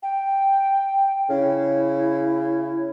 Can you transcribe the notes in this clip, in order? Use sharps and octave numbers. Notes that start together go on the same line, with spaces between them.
G5
C#3 E4